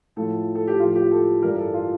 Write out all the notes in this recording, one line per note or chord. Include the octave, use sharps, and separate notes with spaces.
A2 F3 A4
A4
G4
A2 F3 F4
G4
A4
G2 E3 A#4
A4
F4